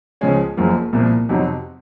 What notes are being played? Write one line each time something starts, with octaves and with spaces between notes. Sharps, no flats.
C#2 C#3 F3 G#3 C#4
F#1 F#2 F3 A#3
C2 A#2 F3 A#3
F2 C3 F#3 C4 D#4